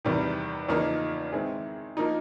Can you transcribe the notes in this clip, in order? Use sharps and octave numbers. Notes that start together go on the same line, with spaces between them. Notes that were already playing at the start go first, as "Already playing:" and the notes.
E2 C3 D#3 G3
E2 C#3 F3 A#3 D#4
D#3 G#3 C4 E4 G#4
F3 A#3 D#4